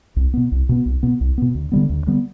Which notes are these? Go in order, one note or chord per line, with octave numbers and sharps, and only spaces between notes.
C2
B2 B3
C2
B2 B3
C2
B2 B3
C2
B2 B3
D2
D3 G3 B3
D2
D3 G3 B3